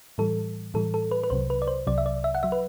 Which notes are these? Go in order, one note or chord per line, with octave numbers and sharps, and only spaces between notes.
A2 E3 G3 A4
A2 E3 G3 A4
A4
B4
B4
C2 C3 F#3 C5
B4
D5
C5
C2 C3 F#3 D5
E5
D5
E5
F#5
F#3 E5
B4